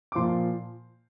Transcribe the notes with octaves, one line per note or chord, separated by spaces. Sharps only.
D6
A#2 F3 C6